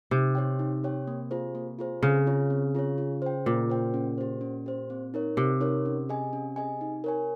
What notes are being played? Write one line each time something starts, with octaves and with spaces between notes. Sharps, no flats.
C3 D#4
G4 C#5 G5
D#4
G4 C#5 G5
A#3
F4 G#4 C5
A#3
F4 G#4 C5
C#3 C4
F4 G#4 C#5
C4
F4 G#4 C#5
F4
C5 G5
A#2 F4
C5 G5
C#4
G4 C5
C#4
G4 C5
C4
D#4 A#4 C#5
C3 C4
D#4 A#4 C#5
C#4
G#4 D#5 G#5
C#4
G#4 D#5 G#5
D#4
A#4 C#5 G#5